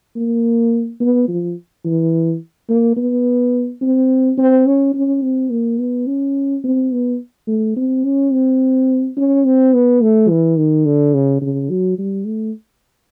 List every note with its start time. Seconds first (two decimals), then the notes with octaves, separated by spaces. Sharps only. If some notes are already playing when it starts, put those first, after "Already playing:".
0.16 A#3
1.00 B3
1.28 F3
1.85 E3
2.69 A#3
2.97 B3
3.82 C4
4.38 C4
4.67 C#4
4.94 C#4
5.22 C4
5.51 A#3
5.79 B3
6.07 C#4
6.64 C4
6.92 B3
7.47 A3
7.76 C4
8.04 C#4
8.32 C4
9.17 C#4
9.45 C4
9.74 B3
10.01 A3
10.29 E3
10.58 D#3
10.86 D3
11.14 C#3
11.41 C#3
11.70 F#3
11.98 G3
12.26 A3